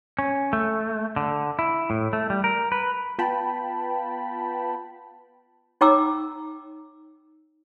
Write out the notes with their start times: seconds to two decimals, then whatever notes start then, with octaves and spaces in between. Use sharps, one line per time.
0.19 C#4
0.53 A3
1.16 D3
1.59 E4
1.90 A2
2.13 A3
2.30 G3
2.44 A#4
2.72 B4
3.19 B3 F4 B4 G5 A5 B5
5.81 D#4 C#5 G5 A#5 D6 E6